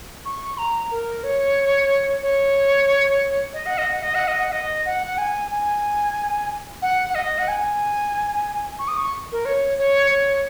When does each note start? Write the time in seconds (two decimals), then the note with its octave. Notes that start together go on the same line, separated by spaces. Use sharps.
0.25 C#6
0.57 A#5
0.90 A#4
1.23 C#5
2.22 C#5
3.53 D#5
3.66 F#5
3.77 D#5
3.91 F#5
4.02 D#5
4.14 F#5
4.27 D#5
4.40 F#5
4.52 D#5
4.85 F#5
5.06 F#5
5.17 G#5
5.51 G#5
6.82 F#5
7.09 F#5
7.14 D#5
7.38 F#5
7.48 G#5
8.79 C#6
8.87 D#6
8.96 C#6
9.31 A#4
9.45 C#5
9.78 C#5
10.10 C#5